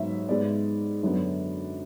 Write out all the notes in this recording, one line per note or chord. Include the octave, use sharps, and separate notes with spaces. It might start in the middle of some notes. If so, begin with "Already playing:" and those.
Already playing: G#2 F#3 B3 C#5 E5
G#2 G#3 B3 D5
F#2 D3 F#3 B3